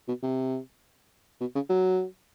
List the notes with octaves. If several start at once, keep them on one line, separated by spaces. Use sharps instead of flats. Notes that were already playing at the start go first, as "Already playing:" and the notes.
B2
C3
B2
C#3
F#3